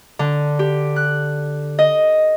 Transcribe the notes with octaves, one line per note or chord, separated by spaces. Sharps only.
D3
G4
F#6
D#5